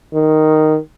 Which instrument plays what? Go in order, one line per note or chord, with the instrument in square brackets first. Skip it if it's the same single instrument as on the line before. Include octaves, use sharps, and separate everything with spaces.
[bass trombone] D#3